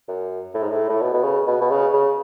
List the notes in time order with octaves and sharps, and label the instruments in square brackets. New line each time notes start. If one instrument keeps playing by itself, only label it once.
[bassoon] F#2
A2
G#2
A2
A2
B2
B2
C#3
B2
B2
C#3
C#3